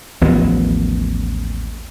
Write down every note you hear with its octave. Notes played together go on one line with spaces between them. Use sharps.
A1 D#2 F3 B3